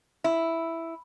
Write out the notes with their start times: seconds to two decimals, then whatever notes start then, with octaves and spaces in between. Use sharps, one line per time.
0.24 E4